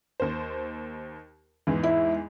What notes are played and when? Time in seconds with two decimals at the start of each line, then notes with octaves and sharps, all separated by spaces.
0.20 D#2 C5
1.67 E2 G#2 E3
1.83 E4